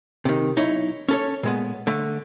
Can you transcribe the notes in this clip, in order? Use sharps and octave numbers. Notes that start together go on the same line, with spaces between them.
C3 D#3
B1 D#4 E4 C#5
C#4 A4 C#5
A#2 G#3 B3
D3 A3